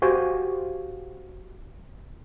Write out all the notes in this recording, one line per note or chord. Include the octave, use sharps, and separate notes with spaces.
F#4 G4 C5 F5 G#5